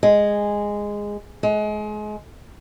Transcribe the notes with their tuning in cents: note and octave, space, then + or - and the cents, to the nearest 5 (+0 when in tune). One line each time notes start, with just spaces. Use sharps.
G#3 -10
G#3 +30